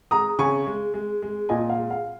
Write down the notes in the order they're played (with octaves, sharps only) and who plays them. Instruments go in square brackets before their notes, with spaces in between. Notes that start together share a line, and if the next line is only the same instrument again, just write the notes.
[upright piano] G#3 A#5 D#6
C#3 G#5 C#6
G#3
G#3
G#3
A#2 D#5 G#5
F5
G#3
F5